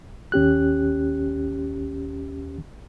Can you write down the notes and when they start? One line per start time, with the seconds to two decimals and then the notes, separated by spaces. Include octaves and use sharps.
0.32 D#2 C#4 G4 F#6